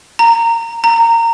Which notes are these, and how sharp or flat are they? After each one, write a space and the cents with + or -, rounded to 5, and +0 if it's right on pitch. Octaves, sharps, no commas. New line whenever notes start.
A#5 -15
A#5 -20